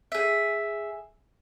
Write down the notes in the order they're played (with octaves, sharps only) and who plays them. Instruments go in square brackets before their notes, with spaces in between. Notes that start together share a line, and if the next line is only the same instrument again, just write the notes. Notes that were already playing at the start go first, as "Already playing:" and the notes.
[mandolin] G#4 E5